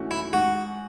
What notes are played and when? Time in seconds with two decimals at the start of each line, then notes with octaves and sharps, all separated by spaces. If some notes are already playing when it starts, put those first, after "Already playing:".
Already playing: G#2 E3 A3 C#4 F#4
0.11 E4
0.33 G#2 F#4